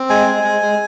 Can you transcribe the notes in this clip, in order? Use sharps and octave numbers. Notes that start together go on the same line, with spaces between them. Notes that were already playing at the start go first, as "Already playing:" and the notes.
Already playing: C4
G#3 G#5
G#3
G#3
G#3